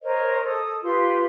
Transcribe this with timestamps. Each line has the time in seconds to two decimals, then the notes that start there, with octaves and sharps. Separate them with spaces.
0.02 A#4 C5 C#5 D#5
0.44 A4 D#6
0.82 F4 G4 B4 C6